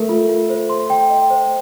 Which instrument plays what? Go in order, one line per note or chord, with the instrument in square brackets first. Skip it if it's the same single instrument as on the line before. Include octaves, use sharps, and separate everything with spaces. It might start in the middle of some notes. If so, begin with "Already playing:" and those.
Already playing: [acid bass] A3 [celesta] A#4
[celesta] F4
F4
C5
C6
G5
D#5
C5